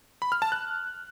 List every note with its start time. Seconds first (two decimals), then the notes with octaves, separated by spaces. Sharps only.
0.22 B5
0.32 F6
0.42 A5
0.52 F#6